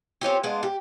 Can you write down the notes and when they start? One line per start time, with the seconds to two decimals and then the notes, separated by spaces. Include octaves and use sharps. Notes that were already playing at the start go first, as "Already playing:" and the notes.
0.21 C4 C#4 F4 G4
0.43 G#3 B3 D4 F4
0.63 G4